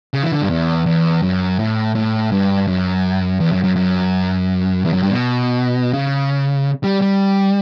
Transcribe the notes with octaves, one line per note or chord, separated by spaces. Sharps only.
C#3
E3
D3
G2
E2
E2
F#2
A2
A2
G2
F#2
E2
F#2
F#2
F#2
E2
F#2
G2
B2
C#3
G3
G3